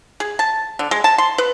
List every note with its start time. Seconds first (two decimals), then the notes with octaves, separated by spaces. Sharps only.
0.20 G#4
0.39 A5
0.79 D3
0.91 G#3
1.04 A5
1.18 C6
1.38 B4